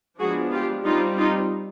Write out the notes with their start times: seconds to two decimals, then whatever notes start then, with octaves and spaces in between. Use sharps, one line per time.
0.20 F3 G#3 B3 D4 F#4 G#4
0.53 F4 G4
0.85 G3 C4 D#4 F4
1.18 D#4 F4